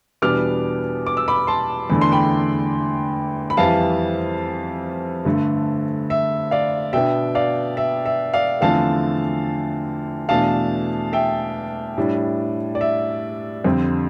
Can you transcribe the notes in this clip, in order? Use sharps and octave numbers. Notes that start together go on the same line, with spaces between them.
E2 B2 G3 B3 D4 D6 F6
D6
E6
B5 D6
A5 C6
E2 D3 A3 D4 B5
C6
G5 B5
B5
F2 E3 G3 F5 A5
G2 D3 A3
E5
D5 F5
B2 B3 D4 E5 G5
D5 F5
E5
E5
D5 F5
E2 D3 F3 A3 C4 F5 A5
E2 B2 A3 D4 F5 A5
E5 G5
A2 G3 D4
D5
E5
F2 D3 G3 C4